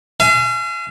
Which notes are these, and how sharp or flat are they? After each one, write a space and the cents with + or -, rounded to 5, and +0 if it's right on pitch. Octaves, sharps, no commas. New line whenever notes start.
F5 -40 G#5 +20